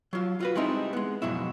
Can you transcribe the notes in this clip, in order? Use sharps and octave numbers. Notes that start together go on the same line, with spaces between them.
F#3 F4
F4 F#4 B4
G3 G#3 C4 D#4 E4
G#3 B3
F2 G#2 B2 F#3 E4